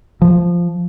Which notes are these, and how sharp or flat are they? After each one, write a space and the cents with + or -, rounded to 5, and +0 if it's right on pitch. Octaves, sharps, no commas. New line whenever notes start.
F3 -5